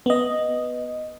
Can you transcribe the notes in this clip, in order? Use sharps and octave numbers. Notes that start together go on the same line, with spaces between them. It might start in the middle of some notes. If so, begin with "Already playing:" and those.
B3 D#5